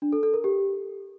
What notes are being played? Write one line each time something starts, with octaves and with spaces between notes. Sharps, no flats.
D4
A4
A4
A#4
G4